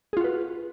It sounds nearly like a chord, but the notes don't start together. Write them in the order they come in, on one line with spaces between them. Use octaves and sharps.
G#4 F4 F#4 B4